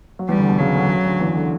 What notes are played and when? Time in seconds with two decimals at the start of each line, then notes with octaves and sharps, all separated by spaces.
0.19 F#3
0.29 E2 E3 G3
0.38 D2 D3
0.49 B2
0.59 C#3 F#3
0.74 D2 D3
0.90 C#3
1.05 D2 D3
1.20 E2 E3
1.35 D3